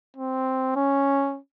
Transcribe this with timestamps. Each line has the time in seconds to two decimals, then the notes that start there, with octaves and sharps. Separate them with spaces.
0.16 C4
0.76 C#4